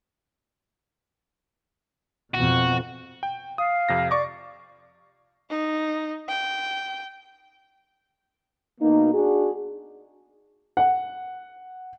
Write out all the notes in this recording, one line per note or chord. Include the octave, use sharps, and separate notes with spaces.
F2 B2 F#4
G5
F5 D#6
F2 C3 A#6
D5 C#6 D6
D#4
G5
B2 A#3 D#4
D4 F#4 G#4
F#5